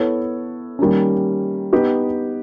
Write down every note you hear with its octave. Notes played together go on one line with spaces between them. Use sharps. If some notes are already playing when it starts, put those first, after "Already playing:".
Already playing: B3 E4 A4 C#5
D#3 G3 A#3 C#4
B3 D#4 G4